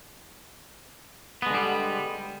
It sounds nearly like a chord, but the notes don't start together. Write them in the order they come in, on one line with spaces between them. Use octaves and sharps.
B3 G#3 D3 G3